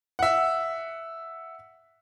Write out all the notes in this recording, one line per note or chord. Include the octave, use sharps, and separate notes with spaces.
E5 F#5